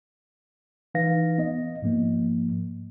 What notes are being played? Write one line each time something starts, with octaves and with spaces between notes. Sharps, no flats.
E3 D#4 B4 F5 A#6
B3 D#5
G#2 F3 A#3